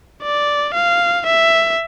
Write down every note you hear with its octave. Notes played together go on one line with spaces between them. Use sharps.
D5
F5
E5